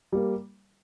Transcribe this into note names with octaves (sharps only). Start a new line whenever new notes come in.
G3 A#3